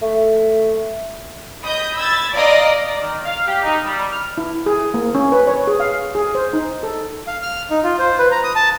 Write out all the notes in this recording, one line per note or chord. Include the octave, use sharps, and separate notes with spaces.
A3
D#5 B5 D#6 G6
B5 E6 G#6 A6
D5 D#5 F5 A#5 D6 D#6
D5
D#3
F5
G4
D#4
G3
F6
E4
G#4
A#3
C#4
B4
C#5
G#4
F5
G#4
C5
D#4
A4
F5
F6
D#4
F4
C5
B4
A#5
D#6
A5